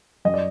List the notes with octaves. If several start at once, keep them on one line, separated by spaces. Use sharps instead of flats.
F#2 D#5
D5